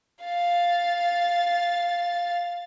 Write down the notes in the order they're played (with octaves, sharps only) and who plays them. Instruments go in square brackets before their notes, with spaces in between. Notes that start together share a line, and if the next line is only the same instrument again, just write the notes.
[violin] F5 A6